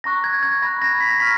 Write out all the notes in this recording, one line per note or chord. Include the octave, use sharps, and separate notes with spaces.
A#5 C#6 F#6 A#6
G#6
G#6
B5 F#6 A#6
A#6
B6
A#6
A#5 C#6 F6 B6